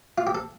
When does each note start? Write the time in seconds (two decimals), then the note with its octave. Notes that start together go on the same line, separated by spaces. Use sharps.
0.18 F4
0.27 G4
0.35 A4